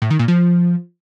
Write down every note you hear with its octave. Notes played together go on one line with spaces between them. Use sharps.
A2
D#3
A#2
F3